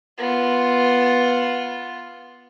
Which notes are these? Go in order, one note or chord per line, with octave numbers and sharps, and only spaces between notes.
B3 F4